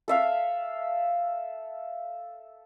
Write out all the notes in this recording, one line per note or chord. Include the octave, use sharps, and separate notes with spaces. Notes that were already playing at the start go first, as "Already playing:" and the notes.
A4 E5 F5